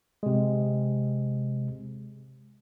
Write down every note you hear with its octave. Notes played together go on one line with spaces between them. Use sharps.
C3 G#3